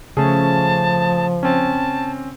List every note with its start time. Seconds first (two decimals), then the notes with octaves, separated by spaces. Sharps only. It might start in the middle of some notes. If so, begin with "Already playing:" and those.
0.17 C#3 F3 A3 C#4 G#4 A5
1.43 C4 C#4 A5